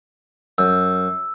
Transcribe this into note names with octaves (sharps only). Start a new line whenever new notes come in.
F#2 E6